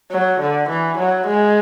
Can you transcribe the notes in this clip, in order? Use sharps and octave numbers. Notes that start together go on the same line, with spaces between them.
F#3
D3
E3
F#3
G#3